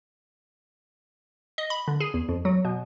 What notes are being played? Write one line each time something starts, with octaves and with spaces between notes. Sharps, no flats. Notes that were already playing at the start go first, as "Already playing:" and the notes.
D#5
B5
D3
G#4
E2
F2
F#3
B2